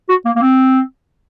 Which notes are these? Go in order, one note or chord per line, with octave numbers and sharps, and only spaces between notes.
F#4
A#3
A#3
C4